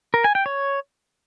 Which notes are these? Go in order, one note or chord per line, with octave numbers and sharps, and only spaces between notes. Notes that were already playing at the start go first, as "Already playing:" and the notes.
A#4
G#5
G5
C#5